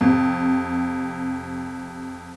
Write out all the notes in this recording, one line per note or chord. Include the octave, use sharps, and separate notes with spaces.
F2 C3